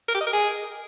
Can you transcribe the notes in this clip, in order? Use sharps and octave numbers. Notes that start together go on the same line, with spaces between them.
A#4
G4
D#5
A#4
G#4